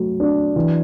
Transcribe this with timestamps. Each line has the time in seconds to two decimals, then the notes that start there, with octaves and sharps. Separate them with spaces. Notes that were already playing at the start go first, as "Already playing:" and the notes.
Already playing: F#3 A3
0.20 D4
0.56 E3